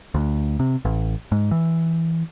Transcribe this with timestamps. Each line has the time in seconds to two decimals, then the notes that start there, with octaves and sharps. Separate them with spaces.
0.14 D2
0.60 C3
0.85 A1
1.32 G#2
1.51 E3